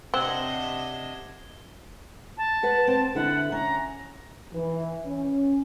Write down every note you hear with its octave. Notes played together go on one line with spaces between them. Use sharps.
C3 C4 D4 D#5 F#5 G#6 E7 G7
A5
B4 F#5
C4
D3 E4 F#5
C#4 A#5
E3
C#4